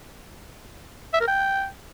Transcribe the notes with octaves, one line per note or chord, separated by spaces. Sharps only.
E5
A#4
G5